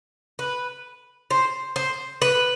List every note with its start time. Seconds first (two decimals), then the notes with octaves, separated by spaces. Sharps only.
0.39 B4
1.31 C5
1.76 C5
2.22 B4